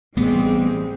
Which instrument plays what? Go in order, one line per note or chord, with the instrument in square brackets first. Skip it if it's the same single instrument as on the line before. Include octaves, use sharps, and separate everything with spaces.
[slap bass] A1 B3 [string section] G3 G#3 C4